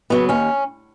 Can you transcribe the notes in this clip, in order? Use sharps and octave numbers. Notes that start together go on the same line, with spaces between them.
C#3 F#3 B3
D#2 C#4